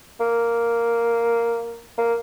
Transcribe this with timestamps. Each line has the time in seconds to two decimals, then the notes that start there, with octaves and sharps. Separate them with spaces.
0.20 A#3
1.98 A#3